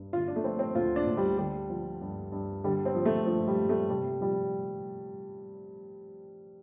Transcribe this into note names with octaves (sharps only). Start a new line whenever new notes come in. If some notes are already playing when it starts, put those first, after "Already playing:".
Already playing: G2
D3 F4
D4
A3
F3 C4
C4
D2 F4
D4
D2
G3
D3 G3
F3
G2
G2
D3 G3
C4
F3
A3
G2 F3
G3
G2
A3
C3 G3
F3 G3